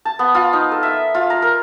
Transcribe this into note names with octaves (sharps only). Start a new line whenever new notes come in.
A5
B3
F4
D#4
A4
E5
F4
A#5
A#4